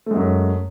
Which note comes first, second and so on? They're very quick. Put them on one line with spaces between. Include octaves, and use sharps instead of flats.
A3 G#3 F#2